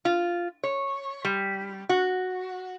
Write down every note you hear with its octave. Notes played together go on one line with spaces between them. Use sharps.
F4
C#5
G3
F#4